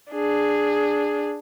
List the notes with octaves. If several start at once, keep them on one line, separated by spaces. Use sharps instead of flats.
D4 G#4